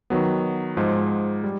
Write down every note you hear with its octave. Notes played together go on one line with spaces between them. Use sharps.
D#3 F#3 B3
G#2 F3 G#3
G3